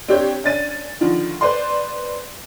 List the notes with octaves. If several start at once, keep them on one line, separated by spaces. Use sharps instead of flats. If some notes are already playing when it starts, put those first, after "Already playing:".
C4 D4 G4 C#5 G6
C#4 D4 A6 D#7
D3 D#3 F3
B4 C5 D5 C6